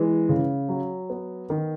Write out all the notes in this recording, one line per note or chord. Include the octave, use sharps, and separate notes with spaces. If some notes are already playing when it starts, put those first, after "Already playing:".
Already playing: E3 G#3
C#3
F#3
B3
D#3